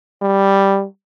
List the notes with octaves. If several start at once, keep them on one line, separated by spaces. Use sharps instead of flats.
G3